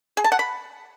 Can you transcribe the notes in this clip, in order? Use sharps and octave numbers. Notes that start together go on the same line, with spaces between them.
G#4
A5
F#5
B5